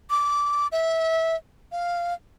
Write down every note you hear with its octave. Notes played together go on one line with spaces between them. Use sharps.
D6
E5
F5